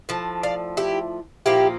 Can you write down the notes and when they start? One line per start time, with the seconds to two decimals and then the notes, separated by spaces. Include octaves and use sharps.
0.09 A2 F3
0.43 D5 F5
0.77 E4 G4
1.46 A#2 F3 A#3 E4 G4